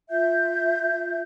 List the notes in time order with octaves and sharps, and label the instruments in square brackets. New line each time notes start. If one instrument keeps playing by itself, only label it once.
[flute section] F4 E5 G6